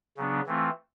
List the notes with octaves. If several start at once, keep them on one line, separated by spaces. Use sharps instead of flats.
C#3 F#3 B3 D4
E3 A3 C4 F4